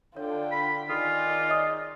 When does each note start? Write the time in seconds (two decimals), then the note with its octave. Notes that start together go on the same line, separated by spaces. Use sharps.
0.16 D3 F4 C#5 G5
0.52 B5
0.89 D#3 D#4 F4 G#4 A4 D5
1.49 C#5 D#5 D#6